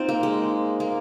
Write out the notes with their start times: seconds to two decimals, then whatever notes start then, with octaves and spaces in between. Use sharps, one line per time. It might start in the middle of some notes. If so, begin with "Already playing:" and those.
Already playing: C4 D#4 F4
0.09 A#3
0.23 G#3
0.80 A#3